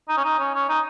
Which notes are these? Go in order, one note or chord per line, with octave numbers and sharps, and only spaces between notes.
D#4
C#4
D#4
C#4
C#4
D#4